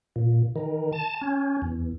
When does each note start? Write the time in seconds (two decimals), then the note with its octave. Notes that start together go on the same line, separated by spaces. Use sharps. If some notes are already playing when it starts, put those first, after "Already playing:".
0.16 A#2
0.56 D#3
0.93 A5
1.21 C#4
1.62 E2